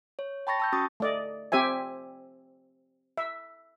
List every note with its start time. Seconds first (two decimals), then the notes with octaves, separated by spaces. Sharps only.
0.19 C#5
0.47 G5 A5 B5 C#6 A6 A#6
0.60 A5 E6 G6
0.73 C#4 F#4 C#6 D#6 A6
1.00 A3 D5 D#5
1.52 C4 G4 C5 E5 G#5
3.17 E5